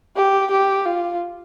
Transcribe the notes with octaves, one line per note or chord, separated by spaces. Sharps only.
G4
G4
F4